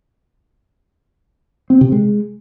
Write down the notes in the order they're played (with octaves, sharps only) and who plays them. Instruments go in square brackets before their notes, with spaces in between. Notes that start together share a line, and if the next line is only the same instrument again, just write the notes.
[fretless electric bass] C4
C3
G#3